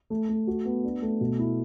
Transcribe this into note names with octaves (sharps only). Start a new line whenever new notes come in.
A3
A3
F#4
B3
D4
A3
B2
E4